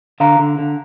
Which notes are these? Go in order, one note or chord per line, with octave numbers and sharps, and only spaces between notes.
D3 F5 A#5
D3
D3